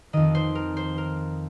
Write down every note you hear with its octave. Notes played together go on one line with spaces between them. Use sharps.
F2 D#3 D#5
C5
A#4
C5
A#4